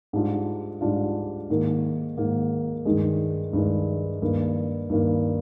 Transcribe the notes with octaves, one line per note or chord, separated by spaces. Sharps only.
G#2 G3 D4 F4
G#2 G3 D4 F4
G#2 D#3 A#3
G#2 D#3 A#3
G2 D#3 G#3
G2 D#3 G#3
G2 D#3 A#3
G2 D#3 A#3